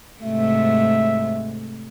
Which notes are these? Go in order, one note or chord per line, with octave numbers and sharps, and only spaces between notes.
G#2 C3 A3 E5